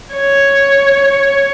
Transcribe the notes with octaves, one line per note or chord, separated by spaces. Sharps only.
C#5